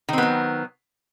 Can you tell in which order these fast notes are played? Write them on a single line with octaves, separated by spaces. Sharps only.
D#3 C4 B3 F#3